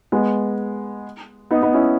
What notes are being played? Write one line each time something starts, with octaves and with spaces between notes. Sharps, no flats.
G#3 B3
B3 D#4
B3 D#4
C#4 E4